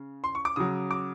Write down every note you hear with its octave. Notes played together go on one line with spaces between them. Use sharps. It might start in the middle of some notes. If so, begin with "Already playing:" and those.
Already playing: C#3
C6
C#6
D6
C#3 F#3 D#6
D6